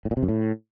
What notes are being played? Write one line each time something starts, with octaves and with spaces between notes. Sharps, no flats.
A2
A#2
C3
F#2
A2